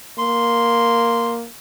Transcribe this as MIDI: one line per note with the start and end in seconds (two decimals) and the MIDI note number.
0.19 1.47 58
0.19 1.32 84